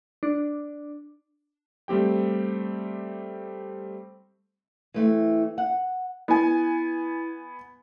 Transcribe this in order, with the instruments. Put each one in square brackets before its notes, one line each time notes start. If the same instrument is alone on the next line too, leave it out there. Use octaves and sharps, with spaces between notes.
[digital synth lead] D4
[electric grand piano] G3 A3 C4 G4 G5
[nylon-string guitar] E3 A3 C4
F#5
[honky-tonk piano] B3 G#5 [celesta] E4